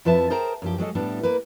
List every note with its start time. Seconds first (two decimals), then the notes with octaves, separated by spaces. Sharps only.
0.05 F2 F3 B4 E5 A5
0.30 G#4 A#4 C5 G5 A5 A#5
0.62 F#2 F3 G4
0.78 F#3 G#3 A4 D#5
0.95 A2 G3 B3 D4
1.23 A#3 B4